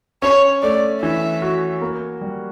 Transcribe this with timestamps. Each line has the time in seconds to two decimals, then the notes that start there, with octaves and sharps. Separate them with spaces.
0.22 C#4 C#5
0.62 A3 D5
1.02 E3 E5
1.42 F#4
1.81 A#3
2.21 G3